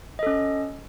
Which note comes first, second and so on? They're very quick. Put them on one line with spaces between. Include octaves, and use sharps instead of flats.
D#5 A4 C#4